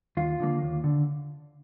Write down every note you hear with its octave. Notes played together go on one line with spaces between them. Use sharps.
D#2 F4
D3 F3 A#3
D#2
D3